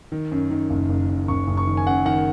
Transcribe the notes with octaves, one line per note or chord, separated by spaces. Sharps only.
D#3
F#2
D#3
F#1
F#1
F#2
F#1 C#6
F#1
C#6
D#3
G#5
F#2 F#5
D#3 F#5